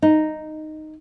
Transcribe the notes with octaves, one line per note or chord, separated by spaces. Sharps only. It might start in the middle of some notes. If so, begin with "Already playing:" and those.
D#4